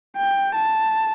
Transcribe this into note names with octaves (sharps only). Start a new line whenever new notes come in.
G5
A5